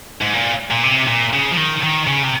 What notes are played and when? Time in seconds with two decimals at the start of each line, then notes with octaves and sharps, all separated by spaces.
0.21 G#2
0.33 A#2
0.71 A#2
0.84 C3
1.08 A#2
1.33 C#3
1.51 F3
1.57 D#3
1.83 D#3
2.08 C#3
2.24 C3